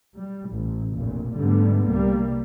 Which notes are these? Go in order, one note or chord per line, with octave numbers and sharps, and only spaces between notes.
G3
A1
F1 A#1 A#2
G#2 D3 G3 A3 B3
C2 G3 A#3